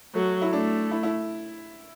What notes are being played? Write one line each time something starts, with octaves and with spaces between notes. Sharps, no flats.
F#3 A3
E4
A3 D4
E4
E4